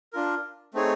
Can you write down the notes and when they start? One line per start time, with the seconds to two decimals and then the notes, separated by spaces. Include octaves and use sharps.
0.13 D4 F4 A#4
0.74 A3 C4 D#4 G#4 C#5